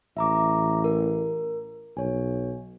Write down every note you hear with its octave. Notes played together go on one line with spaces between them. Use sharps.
A1 E5 A#5 D6
A#4
B1 C#5 G#5